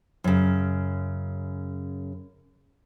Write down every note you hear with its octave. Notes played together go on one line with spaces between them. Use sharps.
F#2 C#3